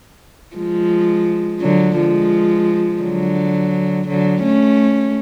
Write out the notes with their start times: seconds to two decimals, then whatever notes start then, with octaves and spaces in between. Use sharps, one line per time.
0.56 F3 G#3
1.61 D3 F#3
1.96 F3 G#3
3.02 D3 F#3
4.08 D3 F#3
4.43 A3 C#4